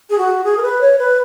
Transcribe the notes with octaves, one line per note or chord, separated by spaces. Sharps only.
G#4
F#4
G#4
A#4
B4
C#5
B4